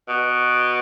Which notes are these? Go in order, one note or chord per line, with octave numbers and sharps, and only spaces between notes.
B2